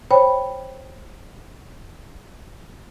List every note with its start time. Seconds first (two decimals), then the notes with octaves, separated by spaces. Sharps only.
0.11 C5 C#5 G5 B5